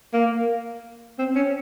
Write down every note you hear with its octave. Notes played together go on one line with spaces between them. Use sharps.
A#3
C4
C#4